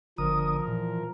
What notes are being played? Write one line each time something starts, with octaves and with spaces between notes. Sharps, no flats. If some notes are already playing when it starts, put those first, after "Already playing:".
G1 D3 F3 A#4 D#6
A#2 E3